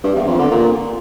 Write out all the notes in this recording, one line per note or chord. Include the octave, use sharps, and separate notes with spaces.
G2
E2
F2
D3
A#2